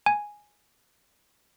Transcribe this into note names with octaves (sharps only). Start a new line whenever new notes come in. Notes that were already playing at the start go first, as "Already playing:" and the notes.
G#5